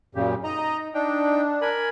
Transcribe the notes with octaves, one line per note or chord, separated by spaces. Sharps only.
F#2 A#2 C#3 G4
D#4 D#5 A#5
D4 D#4 G5
A#4 G#5 B5